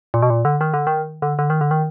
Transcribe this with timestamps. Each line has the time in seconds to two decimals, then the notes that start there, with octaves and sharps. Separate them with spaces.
0.14 A#2
0.22 B2
0.30 A#2
0.45 D3
0.61 D#3
0.74 D3
0.87 D#3
1.22 D3
1.39 D3
1.50 D#3
1.61 D3
1.71 D#3